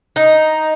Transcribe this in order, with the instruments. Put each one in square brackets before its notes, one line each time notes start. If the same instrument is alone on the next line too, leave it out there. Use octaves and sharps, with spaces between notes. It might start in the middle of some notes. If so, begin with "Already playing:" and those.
[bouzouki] D#4